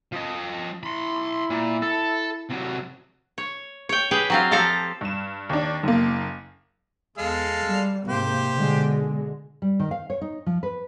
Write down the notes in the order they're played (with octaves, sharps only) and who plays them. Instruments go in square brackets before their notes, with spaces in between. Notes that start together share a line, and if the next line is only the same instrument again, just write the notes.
[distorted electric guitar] F3 D#5
[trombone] E4 [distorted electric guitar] B5 C6
[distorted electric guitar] A#2
A4
C3 F#3
[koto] C#5
C#5 G5
G4 G#4 B4 G5
F#3 C4 F4
F3 G4 A4 F5 A#5
[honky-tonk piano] G2 E7
D#2 D4
F#1 A#3
[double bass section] E2 [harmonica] G#3 A4 F5
[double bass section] G3
[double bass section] G#2 C3 A#3 [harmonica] G4 C5
[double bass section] B2 D3 G#3
[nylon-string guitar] G3
D#3
F5
C#5
D#4
F3
B4